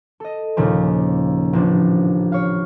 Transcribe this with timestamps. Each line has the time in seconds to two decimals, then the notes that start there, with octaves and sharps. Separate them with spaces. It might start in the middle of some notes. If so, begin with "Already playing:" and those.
0.20 A4 D#5
0.57 D#2 A#2 C#3 F3
1.53 A1 F3 D4
2.32 C#5 F5